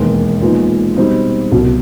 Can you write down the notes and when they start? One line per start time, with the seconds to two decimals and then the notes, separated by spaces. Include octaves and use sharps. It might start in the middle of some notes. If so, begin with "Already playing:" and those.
Already playing: E1 D#2 D#3 G#3 B3
0.41 A#2 F3 G#3 B3 D#4
0.97 B2 G3 C4 D#4
1.52 C2 B2 F#3